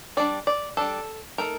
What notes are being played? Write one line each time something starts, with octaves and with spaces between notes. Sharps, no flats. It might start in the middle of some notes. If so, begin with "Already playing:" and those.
G3 D4 D5
D5
G3 D4 A4
A3 D#4 A#4